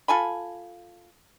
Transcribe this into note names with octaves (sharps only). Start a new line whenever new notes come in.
F4 A4 G#5 B5